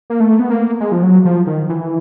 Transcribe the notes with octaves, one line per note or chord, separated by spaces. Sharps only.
A#3
A3
B3
A#3
G#3
F3
F#3
F3
D#3
E3